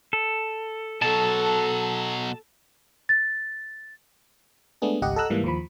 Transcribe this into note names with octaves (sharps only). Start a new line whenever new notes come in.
A4
B2 F#3 A4 A5
A6
G#3 A3 B3 D4 G#4
G#1 C#2 G4 D#5 F#5
A4 D#5 F#5 A#5 E6 F#6
G#2 E3 G3 A#3
D#2 F3 B5